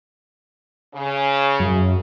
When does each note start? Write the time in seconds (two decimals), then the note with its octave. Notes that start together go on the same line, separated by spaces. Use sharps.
0.94 C#3
1.60 F#2